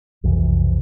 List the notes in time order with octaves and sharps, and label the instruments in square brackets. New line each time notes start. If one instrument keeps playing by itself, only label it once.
[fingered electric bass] B1 F2 C3 E3